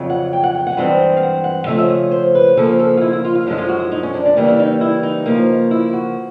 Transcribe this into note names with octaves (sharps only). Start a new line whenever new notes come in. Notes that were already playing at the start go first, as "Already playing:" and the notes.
Already playing: F2 C#3 F#3
F#5
G5
F#5
G5
F#5
G2 E3 G#3 C4
F5
F#5
F#5
C#3 F3 A3 C#4 E5
E5
D#5
C5
B4
C#3 F3 A#3 C#4 A4
A4
F4
E4
E4
F4
F4
F#2 D3 F3 G#3 E4
F4
F#4
E4
D#4
C#4
D4
D4
C#3 E3 G3 A#3 D4
E4
D#4
E4
D#4
C#3 F3 A#3
E4
F#4